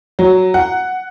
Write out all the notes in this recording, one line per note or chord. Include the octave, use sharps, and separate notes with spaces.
F#3
F#5